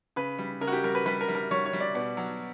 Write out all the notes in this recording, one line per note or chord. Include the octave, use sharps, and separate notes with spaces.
C#3 B4
G3
C#3 A#4
F#4
G4
G3 A#4
B4
G3 B4
A#4
G3
A#4
G3 C#5
C#5
G3
D5
B2 D5
F#3